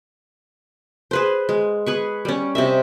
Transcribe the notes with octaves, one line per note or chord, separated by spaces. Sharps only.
G#4 B4 C5
G#3
G#4 B4 C#6
G3 C#4
C3 D#5 E5